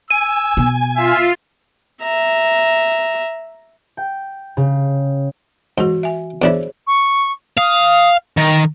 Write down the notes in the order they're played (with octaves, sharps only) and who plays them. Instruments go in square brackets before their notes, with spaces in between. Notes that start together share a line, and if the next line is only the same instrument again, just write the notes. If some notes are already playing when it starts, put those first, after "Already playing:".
[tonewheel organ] G#5 [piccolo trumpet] E6
[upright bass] B2
[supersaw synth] F4 C7 [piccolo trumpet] E5
[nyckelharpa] E5 A#5
[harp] G5
C#3
[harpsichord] G#2 [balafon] E3 F#4
[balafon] E5 G#5
[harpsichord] E2 D4 E4 [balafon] G#4 C5 C#5
[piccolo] C#6
[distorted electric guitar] F5 [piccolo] D#6
[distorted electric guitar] D#3 [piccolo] A#6